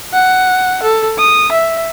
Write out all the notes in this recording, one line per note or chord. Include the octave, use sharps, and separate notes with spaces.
F#5
A4
D#6
E5